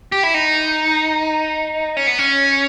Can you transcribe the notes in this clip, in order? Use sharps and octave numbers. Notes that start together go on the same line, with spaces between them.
G4
E4
D#4
C#4
B3
C#4